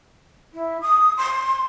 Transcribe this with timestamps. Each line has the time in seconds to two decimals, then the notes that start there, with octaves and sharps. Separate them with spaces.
0.54 E4
0.82 D#6
1.17 C6